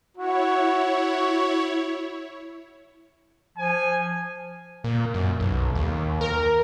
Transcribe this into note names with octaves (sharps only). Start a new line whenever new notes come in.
E4 F#4 C#5
F3 G#5
A#2
F#2
B1
D#2
A#4